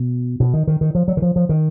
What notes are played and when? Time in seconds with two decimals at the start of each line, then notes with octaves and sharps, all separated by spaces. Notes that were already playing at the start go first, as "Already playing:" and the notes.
Already playing: B2
0.40 B2
0.54 D#3
0.67 D#3
0.81 D#3
0.95 F3
1.08 F#3
1.17 D#3
1.22 F3
1.36 F3
1.49 D#3